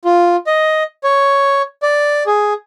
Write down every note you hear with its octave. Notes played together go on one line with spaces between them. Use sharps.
F4
D#5
C#5
D5
G#4